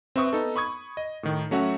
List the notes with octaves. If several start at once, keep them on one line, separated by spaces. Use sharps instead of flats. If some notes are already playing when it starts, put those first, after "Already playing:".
C4 B4 E5 C#6 D#6
B3 D#4 A4
B5 C#6 D#6 G#6
D#5
A2 D#3
F#3 A3 C#4 F#4 E5 F#5